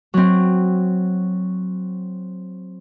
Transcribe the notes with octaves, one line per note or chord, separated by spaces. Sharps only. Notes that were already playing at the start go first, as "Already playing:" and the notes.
F#3 C4